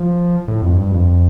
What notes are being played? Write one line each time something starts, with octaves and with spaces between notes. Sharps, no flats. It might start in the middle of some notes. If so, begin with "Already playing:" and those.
Already playing: F3
A2
F2
G2
F2